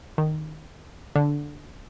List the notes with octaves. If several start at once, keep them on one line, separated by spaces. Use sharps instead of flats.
D#3
D3